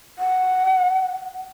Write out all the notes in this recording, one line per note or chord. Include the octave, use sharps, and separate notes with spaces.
F#5